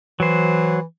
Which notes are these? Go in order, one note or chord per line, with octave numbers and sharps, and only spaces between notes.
E3 F#3 C5